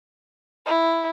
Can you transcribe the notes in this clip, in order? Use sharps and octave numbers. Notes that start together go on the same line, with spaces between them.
E4